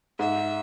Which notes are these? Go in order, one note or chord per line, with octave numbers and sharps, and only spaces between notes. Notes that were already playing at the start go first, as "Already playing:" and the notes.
G#2 E5